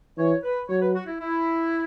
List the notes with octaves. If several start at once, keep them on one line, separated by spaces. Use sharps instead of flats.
E3 C#5
B4
F#3 C#5
B4
F#4
E4
E4